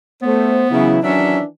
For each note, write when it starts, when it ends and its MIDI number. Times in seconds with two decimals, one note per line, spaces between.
0.22 0.64 57
0.22 1.03 59
0.22 0.70 72
0.71 0.98 49
0.71 1.01 52
0.71 0.98 54
0.71 1.01 64
1.03 1.45 51
1.03 1.45 52
1.03 1.38 54
1.03 1.38 61
1.03 1.45 62
1.03 1.38 76